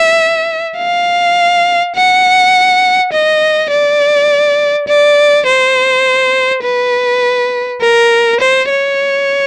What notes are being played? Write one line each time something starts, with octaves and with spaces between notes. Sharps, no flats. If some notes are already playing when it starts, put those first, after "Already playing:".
Already playing: E5
F5
F#5
D#5
D5
D5
C5
B4
A#4
C5
C#5